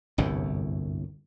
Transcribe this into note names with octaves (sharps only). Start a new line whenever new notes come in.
G1 C2 F#2 A2